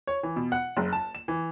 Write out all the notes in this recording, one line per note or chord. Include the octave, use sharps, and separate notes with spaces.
C#5
E3
B2
F#5
F#1
A5
E7
E3